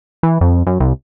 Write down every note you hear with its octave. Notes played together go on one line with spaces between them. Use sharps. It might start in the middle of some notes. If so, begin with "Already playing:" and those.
E3
F2
F#2
C2